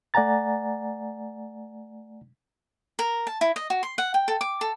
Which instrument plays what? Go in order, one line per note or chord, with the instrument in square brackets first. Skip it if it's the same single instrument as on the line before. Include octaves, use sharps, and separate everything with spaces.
[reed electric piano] A3 D5 F#5 G#5 A#5 A6
[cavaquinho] A#4
A5
E4
D#5
F#4
C6
F#5
G5
A4
D6
A4